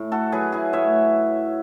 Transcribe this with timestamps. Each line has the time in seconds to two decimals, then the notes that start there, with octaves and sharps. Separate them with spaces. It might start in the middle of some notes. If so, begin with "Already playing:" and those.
Already playing: A2
0.12 F#4 A4
0.32 F#3 G#4 B4
0.52 E4 G#4
0.73 A2 C#5 E5